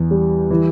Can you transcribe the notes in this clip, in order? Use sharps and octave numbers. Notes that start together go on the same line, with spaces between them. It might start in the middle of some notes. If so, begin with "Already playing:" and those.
Already playing: E2
G3
E3